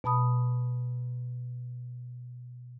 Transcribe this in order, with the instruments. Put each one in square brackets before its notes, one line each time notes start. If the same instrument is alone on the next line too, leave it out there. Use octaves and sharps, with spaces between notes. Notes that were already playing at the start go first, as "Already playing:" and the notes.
[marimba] B2 A5 B5 D#6